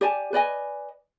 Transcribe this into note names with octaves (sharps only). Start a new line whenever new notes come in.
G4 D5 G#5 A5
B4 D5 D#5 G#5